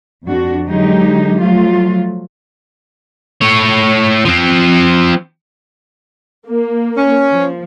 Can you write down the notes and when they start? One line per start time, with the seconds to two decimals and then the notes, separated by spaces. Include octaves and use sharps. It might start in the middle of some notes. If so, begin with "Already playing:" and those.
0.24 F2 D4 F#4
0.66 D3 F#3 G#3 D#4 G4
1.39 F3 F#3 A3 F4
3.41 A3 C#5
4.25 F3 C4
6.47 A#3
6.96 C#4
7.31 F3